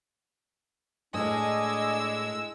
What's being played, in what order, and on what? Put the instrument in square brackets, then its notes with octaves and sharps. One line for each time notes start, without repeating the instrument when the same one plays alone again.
[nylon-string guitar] A2 [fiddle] G#3 E6 [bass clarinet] D4 [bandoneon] D#5 G#5